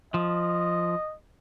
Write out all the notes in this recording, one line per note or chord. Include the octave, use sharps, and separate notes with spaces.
F3 D#5